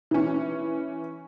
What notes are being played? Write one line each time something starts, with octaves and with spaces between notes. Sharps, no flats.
E3 C#4